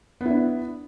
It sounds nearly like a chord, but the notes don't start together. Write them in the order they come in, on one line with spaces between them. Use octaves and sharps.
B3 E4 D4